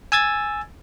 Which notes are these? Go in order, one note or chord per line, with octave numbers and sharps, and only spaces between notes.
G#5 E6 G#6 A6